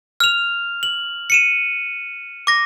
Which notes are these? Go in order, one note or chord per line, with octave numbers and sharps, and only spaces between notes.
F6 F7
F#7
C#7 D#7 E7
D6 A#6